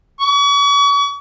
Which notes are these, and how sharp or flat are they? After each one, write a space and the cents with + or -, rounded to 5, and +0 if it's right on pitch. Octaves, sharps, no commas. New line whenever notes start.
C#6 +40